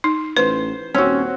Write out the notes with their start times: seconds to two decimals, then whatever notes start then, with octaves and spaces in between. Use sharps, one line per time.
0.04 D#4
0.37 A1 B4 C5
0.94 D#1 C4 C#4 F#4